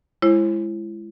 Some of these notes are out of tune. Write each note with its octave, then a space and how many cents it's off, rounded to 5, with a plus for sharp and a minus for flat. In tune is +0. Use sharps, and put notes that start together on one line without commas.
G#3 +0 E4 +30 C5 +40